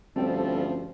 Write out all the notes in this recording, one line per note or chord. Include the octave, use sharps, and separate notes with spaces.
D2 G2 F3 G3 C4 C#4 A4 G5